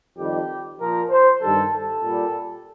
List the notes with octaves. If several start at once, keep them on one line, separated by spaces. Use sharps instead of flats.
F2 D#3 G3 G4
A#2 F3 A#4
C5
G2 D#3 G3 A4
A4
A#2 G3